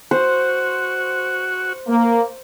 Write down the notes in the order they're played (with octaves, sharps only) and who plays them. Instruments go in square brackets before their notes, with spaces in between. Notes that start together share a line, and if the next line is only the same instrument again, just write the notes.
[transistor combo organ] F#4 [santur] C5
[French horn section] A#3